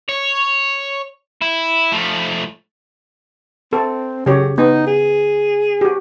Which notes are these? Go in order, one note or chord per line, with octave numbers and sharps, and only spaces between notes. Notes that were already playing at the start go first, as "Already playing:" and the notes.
C#5
E4
F3 A3
C4 A4
C#3 F#3 G4 C#5
B3 D#4
G#4
F#4 G4